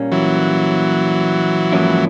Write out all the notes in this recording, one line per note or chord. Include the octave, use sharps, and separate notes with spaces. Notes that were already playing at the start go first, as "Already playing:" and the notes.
Already playing: A#2 G3 A#3 C#4
E3 F#3
G#2 F3 A#3 C#4 E4